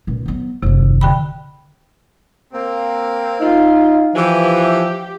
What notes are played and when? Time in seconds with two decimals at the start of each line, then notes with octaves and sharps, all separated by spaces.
0.07 C#2 A#2
0.26 F#3 B3
0.62 F#1 D#2 C3
1.01 D3 G5 B5
2.53 A#3 C4
3.41 D#4 F4
4.15 E3 F3 G4